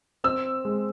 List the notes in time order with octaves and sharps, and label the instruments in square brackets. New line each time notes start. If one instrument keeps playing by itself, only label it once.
[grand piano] C4 [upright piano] E6
[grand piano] G#3